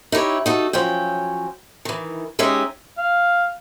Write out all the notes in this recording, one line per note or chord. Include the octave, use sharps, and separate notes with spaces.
D#4 E4 G4 C#5
D#4 F#4 A4
F3 F#3 C#4 G5
D#3 E3
G#3 C#4 D#4 G4 E5
F5